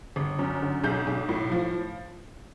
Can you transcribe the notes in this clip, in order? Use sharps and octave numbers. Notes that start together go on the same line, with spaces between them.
G1
F#2
D3
B1 G6
B1
A2
F3